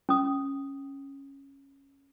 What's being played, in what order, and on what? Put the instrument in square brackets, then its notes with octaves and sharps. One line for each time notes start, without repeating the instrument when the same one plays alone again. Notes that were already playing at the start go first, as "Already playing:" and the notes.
[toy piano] C#4 D#6